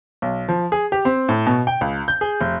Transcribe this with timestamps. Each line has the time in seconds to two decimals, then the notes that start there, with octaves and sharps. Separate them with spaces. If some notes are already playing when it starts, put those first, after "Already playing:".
0.22 B1
0.48 F3
0.72 G#4
0.92 G4
1.05 C4
1.29 A2
1.46 B2
1.67 G5
1.81 C#2
2.08 G6
2.21 G#4
2.41 F1